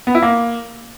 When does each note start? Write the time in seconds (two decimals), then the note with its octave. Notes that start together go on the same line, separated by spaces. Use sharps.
0.07 B3
0.15 E4
0.22 A#3